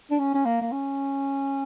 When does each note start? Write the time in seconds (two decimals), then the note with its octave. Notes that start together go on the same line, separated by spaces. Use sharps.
0.10 D4
0.19 C#4
0.34 C#4
0.45 A#3
0.61 A#3
0.72 C#4